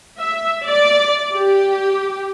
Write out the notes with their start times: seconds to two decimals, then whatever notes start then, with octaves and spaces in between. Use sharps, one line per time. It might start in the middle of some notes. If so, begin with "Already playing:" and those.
0.18 E5
0.65 D5
1.34 G4